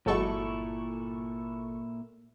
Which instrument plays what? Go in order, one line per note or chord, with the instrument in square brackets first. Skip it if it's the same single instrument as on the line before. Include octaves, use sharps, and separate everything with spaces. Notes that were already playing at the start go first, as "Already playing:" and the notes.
[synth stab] G1 A4 C#6 [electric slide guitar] A#2 E4 [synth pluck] F#3 G#3 F#4